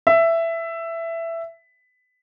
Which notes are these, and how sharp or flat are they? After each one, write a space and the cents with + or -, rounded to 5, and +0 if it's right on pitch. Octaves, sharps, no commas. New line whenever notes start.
E5 +10